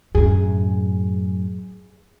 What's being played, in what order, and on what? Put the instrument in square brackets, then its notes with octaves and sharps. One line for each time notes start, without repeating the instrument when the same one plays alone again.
[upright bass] F#2 A2 [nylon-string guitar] G#4